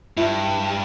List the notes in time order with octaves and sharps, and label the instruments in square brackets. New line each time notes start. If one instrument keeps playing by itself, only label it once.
[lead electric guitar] G2 [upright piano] E4